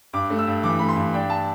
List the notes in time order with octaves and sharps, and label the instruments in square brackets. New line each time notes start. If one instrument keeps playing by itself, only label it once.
[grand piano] G2 D6
A3
E6
G2
E3 D6
A3 B5
C6
G2
D4 G5
A5